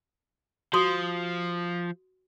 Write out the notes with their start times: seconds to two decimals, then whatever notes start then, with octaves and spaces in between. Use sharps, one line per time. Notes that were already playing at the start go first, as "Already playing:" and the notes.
0.73 F3 F#4 C6 D#6